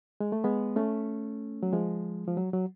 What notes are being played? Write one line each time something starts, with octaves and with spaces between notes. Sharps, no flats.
G#3
A3
G#3 B3
A3 C#4
F#3
F3 G#3
F3
F#3
F#3